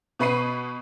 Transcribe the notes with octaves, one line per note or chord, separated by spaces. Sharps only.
B2 B3 B5 C#6 C7 D#7